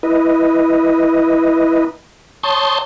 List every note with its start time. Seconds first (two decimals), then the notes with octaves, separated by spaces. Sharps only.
0.03 E4 B4 D#5
2.43 C#5 A5 C6 C#6 D#6 G6